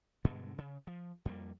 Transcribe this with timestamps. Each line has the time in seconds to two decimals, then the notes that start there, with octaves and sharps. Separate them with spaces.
0.24 G2 B2 D3 G#3
0.58 C#3
0.87 F3
1.25 F2 G3 G#3 A#3